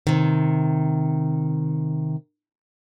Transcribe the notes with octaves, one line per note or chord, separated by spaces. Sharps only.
C3 D#3